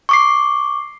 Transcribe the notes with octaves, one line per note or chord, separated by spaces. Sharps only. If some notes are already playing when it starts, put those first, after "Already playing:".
C#6 D6 C7